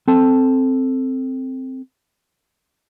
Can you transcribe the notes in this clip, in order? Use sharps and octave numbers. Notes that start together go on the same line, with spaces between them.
C4 A4 A5